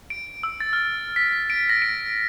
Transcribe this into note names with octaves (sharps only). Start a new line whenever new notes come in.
D7
E6
A6
F6
B6
D7
A#6
D7